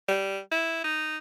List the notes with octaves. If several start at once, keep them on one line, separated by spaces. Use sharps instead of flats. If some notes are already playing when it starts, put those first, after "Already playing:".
G3
E4
D#4